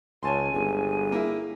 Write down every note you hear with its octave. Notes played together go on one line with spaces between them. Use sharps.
C#2 C#5 G#5 A5 C6
G1 G#4
A#3 E4